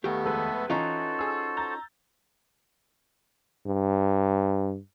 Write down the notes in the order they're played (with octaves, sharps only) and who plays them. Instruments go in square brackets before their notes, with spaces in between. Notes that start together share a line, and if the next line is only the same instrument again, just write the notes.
[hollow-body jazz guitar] D#2 G4 [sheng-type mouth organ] A3 B3 [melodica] C#6
[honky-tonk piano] F1 G#3 B4 [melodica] A4 E5
[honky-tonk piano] E3 [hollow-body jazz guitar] C#4 D#4 F4 [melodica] F#4 C5 [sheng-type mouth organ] A4
[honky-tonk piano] G#4 E6
A#5 G6 A6
[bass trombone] G2